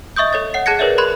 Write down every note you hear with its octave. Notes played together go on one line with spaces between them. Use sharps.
D#5 E5 C#6 D#6 G6
A4 C#5 A6
C#5 F#5 C7
G#4 A5 F#6 G#6 A#6 C#7
G#4 A#4 B4 C#5 D5 E5
G#4 A#4 B5 C6 F#6 G#6